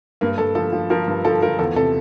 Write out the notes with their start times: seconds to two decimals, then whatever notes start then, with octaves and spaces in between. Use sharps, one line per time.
0.21 G2 A#3
0.38 G2 A4
0.55 F3 A4
0.72 F3
0.90 F3 A#4
1.08 G2
1.25 F3 A4
1.42 F3 A#4
1.59 E2 A4
1.76 C3 A4